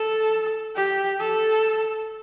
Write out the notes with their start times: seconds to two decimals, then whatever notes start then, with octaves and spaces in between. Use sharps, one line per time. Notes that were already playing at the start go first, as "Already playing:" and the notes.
Already playing: A4
0.76 G4
1.20 A4